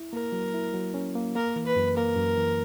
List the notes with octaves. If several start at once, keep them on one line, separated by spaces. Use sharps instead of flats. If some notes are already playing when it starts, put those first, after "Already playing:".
Already playing: E4
A#3 A#4
F#3
E4
F#3
C#4
A#3
A#3 A#4
E3
B4
F#2
A#3 A#4
F#2
E3